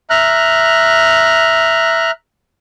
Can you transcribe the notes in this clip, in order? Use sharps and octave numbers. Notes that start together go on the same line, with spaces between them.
E5 A#5 F6 F#6